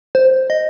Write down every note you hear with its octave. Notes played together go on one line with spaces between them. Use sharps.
C5
D#5